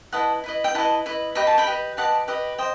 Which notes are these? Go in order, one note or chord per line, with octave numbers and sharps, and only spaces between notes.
E4 B4 D#5 F#5 A5
E4 B4 D#5
G5
E4 B4 D#5 F#5 A5
E4 B4 D#5
G4 B4 D#5 B5
A5
G5 B5
G4 B4 D#5
G4 B4 D#5 F#5 A5
G4 B4 D#5
C5 D#5 G5